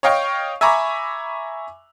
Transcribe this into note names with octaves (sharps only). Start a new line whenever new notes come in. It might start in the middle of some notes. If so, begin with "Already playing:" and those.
C#5 D#5 F5 G5 C#6
E5 G#5 A#5 B5 C#6 D6